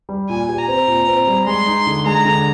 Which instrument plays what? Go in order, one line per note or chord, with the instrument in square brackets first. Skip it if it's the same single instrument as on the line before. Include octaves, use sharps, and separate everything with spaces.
[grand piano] G3
[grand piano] A#2 [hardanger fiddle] G#5
[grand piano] G4
[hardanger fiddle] A#5
[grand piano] C4
A#2
C4
G3
[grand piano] G#3 [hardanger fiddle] C6
[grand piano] D#4
D3
[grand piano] G#3 [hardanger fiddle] A#5
[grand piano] D3